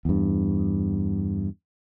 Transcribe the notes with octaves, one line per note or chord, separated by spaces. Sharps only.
E2 G2